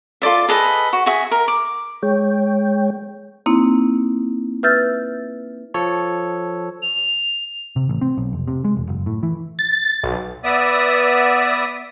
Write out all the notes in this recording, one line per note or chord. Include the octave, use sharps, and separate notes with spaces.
F4 A4 D5 E5
G#4 A4 B4 D#5
F#4
F#4 G#4 E5 G#5
A#4
D6
G#3 C#5 G5
A#3 C4 D#4 E4
B4 E5 E6 F6 G6 A6
F3 A4 C#5
F7
C3
A1
C4
B1
F1
C3
G#3
E1
F#1
A2
E3
A6
B1
B3 D5 E5 D#6